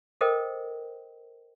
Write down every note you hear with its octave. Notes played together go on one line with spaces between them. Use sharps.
A4 A#4 C5 D#5 G5